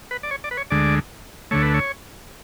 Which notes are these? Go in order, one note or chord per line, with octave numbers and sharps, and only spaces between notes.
B4
D5
C#5
D5
B4
C#5
D2 D3 G#3 D5
D2 D3 A3 C#5
B4
C#5